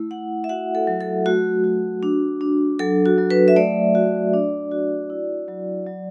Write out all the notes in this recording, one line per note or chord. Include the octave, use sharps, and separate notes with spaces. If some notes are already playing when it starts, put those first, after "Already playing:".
Already playing: A3 E4
E4 F#5
E5
F#4 F#5
A4
F#3
A4
A3 F#4
F#4
D4
D4
F#3 A4
F#4
F#3
B4
E5
A3 D5
F#4
D4
F#4
E4
F#3
F#3